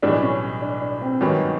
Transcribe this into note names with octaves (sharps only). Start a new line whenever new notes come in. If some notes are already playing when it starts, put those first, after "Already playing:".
B1 A2 E3 G3 D4
C#4
D4
D4
C4
G#1 G2 D#3 F#3 B3 C#4